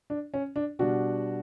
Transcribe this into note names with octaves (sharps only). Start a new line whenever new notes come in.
D4
C#4
D4
B2 G3 D4 F#4